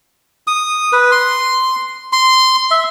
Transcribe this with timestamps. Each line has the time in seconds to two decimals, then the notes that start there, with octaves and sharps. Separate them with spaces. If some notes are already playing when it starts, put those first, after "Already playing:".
0.47 D#6
0.93 B4
1.11 C6
2.13 C6
2.71 E5